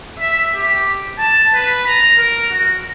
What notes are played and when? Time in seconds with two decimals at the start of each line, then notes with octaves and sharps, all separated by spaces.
0.20 E5
0.55 G4
1.19 A5
1.54 B4
1.87 A#5
2.18 A#4
2.51 F#4